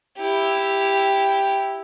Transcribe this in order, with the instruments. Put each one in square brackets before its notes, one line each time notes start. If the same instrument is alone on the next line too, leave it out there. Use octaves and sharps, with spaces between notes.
[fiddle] E4 G4